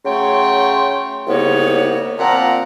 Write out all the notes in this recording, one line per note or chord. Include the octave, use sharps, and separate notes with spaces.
C#3 F#3 A3 C#5 G5 C6
C2 G#2 C#3 A#3 B3 C#5
A#2 F3 C4 D5 F#5 A#5